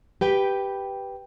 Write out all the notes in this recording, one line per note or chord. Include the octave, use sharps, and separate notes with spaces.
G4 B4 G5